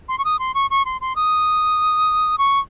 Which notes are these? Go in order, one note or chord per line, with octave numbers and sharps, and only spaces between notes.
C6
C#6
D#6
C6
C#6
C#6
C6
C6
D#6
C#6